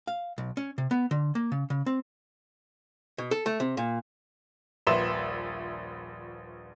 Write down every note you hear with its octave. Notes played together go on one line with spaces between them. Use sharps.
F5
B1
C#4
C3
B3
D3
A#3
C#3
C#3
C4
B2
A4
A3
C3
A#2
D#1 A#1 B4 E5 C6 E7